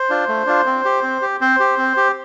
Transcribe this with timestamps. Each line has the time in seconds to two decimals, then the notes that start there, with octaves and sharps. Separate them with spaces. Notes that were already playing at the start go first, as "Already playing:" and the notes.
Already playing: C5
0.10 D4 F4
0.28 A3
0.46 D4 F4
0.66 C4
0.85 G4
1.03 C4
1.22 G4
1.41 C4 C5
1.60 G4
1.78 C4
1.97 G4